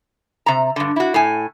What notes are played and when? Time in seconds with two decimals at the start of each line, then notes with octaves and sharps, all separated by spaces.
0.46 C3 A#5
0.76 G2 D3
0.96 E4 F#4
1.14 A2 G#5